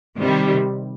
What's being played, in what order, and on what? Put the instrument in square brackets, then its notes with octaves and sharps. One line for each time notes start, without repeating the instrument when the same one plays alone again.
[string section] C3 D#3 G3